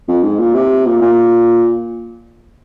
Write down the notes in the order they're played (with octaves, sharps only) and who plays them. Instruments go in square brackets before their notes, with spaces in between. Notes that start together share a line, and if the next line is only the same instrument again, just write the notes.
[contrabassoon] F2
G#2
A#2
C3
A#2
A#2